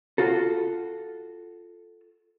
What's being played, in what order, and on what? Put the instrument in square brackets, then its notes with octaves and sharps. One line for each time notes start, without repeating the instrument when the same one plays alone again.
[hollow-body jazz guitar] F4 F#4 A4